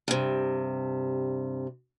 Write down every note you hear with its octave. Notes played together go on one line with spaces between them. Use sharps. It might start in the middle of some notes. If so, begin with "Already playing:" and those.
G2 C3